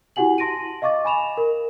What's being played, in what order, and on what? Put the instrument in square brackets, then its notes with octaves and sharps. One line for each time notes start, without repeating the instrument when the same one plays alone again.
[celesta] E4 F#4 G4 F#5 G#5 F#7
A5 C6 A#6 D7 D#7
D#5 F5 C#6 D6 A6
G#5 B5 E7 F7
A#4